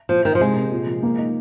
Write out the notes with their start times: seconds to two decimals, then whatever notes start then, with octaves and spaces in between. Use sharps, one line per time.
0.09 A#2 F3
0.25 D#3 D#4
0.35 F3
0.40 C3 G#3
0.56 C3
0.71 A#2
0.87 F3
1.03 A#3
1.18 D#4